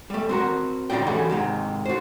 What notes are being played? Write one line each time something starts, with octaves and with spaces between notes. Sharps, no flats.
G3 A3
C4 F#4 A#4
D2 D#3 G3 C#4 D5 G5
E3 F#3 G3 A3 F#4 G#4
G#2 C3 D#3 G#3
F#4 C5